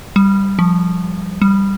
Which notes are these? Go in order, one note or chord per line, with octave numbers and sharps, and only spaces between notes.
G3
F3
G3